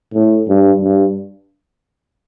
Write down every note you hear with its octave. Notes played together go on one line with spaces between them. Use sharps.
A2
G2
G2